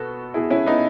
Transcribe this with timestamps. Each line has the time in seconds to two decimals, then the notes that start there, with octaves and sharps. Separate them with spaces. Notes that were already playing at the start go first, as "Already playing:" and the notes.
Already playing: B2 B3 F#4 A4
0.34 B2 E4 G#4
0.50 C#4 E4
0.66 B3 D#4